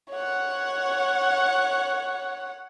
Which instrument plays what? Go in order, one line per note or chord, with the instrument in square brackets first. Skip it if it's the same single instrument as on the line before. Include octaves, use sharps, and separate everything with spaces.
[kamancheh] C#5 F#5